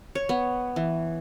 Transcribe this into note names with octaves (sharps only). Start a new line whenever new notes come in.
C#5
B3
E3